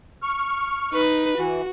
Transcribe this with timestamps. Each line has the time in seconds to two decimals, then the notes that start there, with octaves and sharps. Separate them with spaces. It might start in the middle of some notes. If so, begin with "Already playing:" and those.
0.22 C#6 F6
0.92 D#4 B4
1.38 E3 F#4